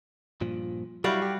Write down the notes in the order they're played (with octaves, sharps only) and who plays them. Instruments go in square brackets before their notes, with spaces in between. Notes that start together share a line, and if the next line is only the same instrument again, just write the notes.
[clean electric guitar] G2 A#2 F3
[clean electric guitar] F#3 E4 [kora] G3 F#4 F5
[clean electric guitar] G4